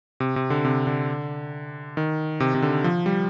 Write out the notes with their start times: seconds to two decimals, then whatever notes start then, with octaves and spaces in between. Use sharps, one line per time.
0.20 C3
0.36 C3
0.50 D3
0.65 C3
0.87 D3
1.97 D#3
2.40 C3
2.55 C3
2.62 D3
2.84 F3
3.06 G3